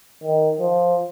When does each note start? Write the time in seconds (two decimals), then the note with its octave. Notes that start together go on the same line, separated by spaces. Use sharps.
0.24 D#3
0.60 F3